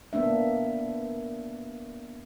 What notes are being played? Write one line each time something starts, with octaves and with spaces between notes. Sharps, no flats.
A#3 B3 D4 E5